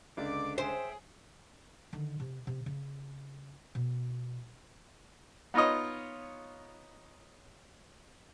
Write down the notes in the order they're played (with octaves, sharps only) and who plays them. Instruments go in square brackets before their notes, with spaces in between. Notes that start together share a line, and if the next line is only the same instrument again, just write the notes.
[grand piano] C#2 D3 [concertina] D5 D6
[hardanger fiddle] G#4 [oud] C5 [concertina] E5 G5
[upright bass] D3 D#3
C3
C3
C#3
B2
[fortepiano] B3 D#4 F4 C#5 D#5